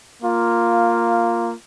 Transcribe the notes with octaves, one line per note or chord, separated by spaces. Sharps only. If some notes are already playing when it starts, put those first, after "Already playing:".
A#3 F4